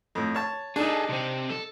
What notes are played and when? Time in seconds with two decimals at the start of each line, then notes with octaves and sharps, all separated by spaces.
0.15 F2 A2
0.35 C#5 A5
0.76 D4 D#4 G#4 A4
1.10 C3 C4
1.50 A4